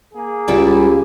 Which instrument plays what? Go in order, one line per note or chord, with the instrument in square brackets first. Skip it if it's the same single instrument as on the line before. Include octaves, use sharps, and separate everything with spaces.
[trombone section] A#3 G#4
[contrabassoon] C#2 [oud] G3 E4 D5 [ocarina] G4